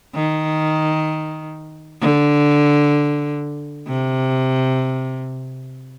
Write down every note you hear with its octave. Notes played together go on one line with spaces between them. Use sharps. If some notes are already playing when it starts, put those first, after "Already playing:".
D#3
D3
C3